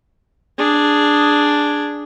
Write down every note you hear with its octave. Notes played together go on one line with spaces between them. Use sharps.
D4 G#4